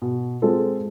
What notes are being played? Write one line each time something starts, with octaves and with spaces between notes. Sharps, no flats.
B2
G#3 C4 F4 A4